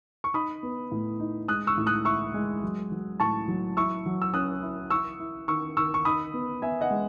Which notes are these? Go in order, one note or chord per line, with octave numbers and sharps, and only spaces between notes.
C#6
D#4 B5 D#6
B3
A2
D#4
G#3 D#6 F#6
C#6 E6
A2
D#6 F#6
E4 C#6 E6
G#3
F#3
F#3
A2 A5 C#6
F#3
E4 C#6 E6
F#3
E6
C#4 D#6 F#6
E4
E4 C#6 E6
E4
D#3 C#6 E6
D#3 C#6 E6
C#6
D#4 B5 D#6
B3
B3 E5 G#5
D#5 F#5
G#3